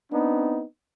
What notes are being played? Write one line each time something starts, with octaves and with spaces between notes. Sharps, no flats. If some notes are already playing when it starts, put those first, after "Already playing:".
B3 C4 D4 D#4